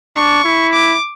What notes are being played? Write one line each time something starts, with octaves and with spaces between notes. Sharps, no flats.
D4 C#6
E4
D6